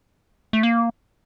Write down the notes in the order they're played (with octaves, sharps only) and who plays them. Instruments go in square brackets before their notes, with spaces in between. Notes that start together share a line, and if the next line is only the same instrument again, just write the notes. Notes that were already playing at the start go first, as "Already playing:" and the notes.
[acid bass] A3
A#3